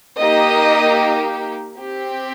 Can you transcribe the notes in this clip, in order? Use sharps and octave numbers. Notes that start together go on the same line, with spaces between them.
A#3 D#4 G4 D#5
C4 G4